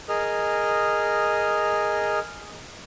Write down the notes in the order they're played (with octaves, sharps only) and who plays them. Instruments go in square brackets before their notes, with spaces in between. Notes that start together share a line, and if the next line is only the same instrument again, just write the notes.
[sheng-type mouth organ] G#4 A#4 D#5 F6